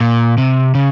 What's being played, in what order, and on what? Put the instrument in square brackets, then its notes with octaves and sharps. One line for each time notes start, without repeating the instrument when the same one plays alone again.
[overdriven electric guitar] A#2
C3
C#3